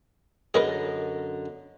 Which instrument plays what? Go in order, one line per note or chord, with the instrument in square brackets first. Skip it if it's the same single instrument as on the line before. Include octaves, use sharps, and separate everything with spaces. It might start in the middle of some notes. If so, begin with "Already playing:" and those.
[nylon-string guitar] F#2 D3 D#5 [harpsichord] G#4 A#4 B4